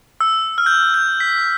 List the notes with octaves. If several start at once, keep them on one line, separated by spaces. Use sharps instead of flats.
E6
F6
G6
F6
G6
B6